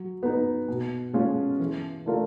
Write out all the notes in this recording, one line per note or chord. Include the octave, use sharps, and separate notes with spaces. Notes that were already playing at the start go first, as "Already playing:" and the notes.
Already playing: F#3
B3 D#4
B2
G#3 C#4 F4 G#4
E3
A3 D4 F4 A#4